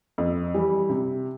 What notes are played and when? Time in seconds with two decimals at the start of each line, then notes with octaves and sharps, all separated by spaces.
0.18 F2
0.54 E3 G3
0.89 C3